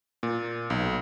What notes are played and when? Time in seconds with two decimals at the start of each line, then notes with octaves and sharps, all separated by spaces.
0.23 A#2
0.70 B1